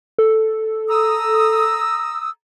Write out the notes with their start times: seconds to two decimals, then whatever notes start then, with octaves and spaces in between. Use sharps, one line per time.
0.18 A4
0.89 A#5 D#6 E6